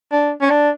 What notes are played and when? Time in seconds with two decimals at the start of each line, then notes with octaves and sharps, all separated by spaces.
0.12 D4
0.41 C#4
0.50 D4